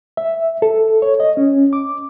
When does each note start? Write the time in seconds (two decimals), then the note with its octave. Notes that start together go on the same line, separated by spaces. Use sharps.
0.17 E5
0.62 A4
1.02 C#5
1.20 D#5
1.37 C#4
1.73 D6